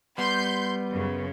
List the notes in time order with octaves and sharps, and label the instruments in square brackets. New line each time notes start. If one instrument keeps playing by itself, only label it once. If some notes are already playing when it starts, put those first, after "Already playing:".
[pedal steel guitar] G3 [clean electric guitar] B3 [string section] C6 G6
[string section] F#2 C#3